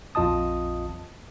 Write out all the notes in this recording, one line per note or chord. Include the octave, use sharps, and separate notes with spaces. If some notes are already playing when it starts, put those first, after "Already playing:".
A#1 F2 F4 D#5 A5 D#6